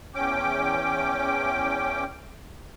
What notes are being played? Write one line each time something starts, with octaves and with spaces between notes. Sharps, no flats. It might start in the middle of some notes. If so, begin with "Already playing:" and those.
E2 C#4 G5 D6